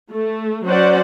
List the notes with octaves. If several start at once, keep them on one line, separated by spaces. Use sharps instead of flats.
A3
F#3 C#4 C5 D5 F#5